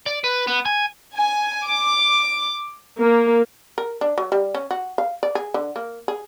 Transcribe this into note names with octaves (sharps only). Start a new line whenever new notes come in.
D5
B4
B3
G#5
G#5
D6
A#3
A#4
D4
F#3
G3
C#4
F#4
F5
D5
G#4
D3
A#3
G#4